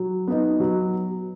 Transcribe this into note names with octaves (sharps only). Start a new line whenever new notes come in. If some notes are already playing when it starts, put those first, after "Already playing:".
Already playing: F#3
B3 D#4
F#3